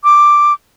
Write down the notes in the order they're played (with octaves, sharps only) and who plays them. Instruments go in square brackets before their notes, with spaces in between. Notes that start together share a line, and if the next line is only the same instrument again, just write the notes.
[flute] D6